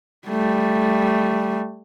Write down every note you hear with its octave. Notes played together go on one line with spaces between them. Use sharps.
G3 A3